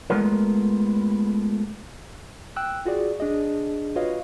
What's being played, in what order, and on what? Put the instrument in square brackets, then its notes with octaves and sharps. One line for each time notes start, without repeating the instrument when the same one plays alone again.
[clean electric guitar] G#3 A3 B3 F4 A#4
[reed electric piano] G5 E6 F#6
F4 F#4 G#4 D5
D4 G#4 D#5
F4 F#4 B4 C#5 D#5 F5